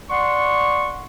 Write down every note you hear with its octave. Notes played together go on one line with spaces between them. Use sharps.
D5 F#5 C6 C#6